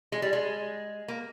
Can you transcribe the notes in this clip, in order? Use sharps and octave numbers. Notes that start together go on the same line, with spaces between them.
G#3
G3
G#3
A#3